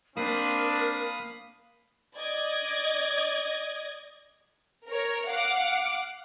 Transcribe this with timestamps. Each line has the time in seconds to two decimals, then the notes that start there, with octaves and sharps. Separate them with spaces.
0.17 A#3 C4 D4 A#4 F5 B5 D#6
2.15 D5 D#5 G#6
4.86 A#4 C#5
5.27 F5 F#5 D6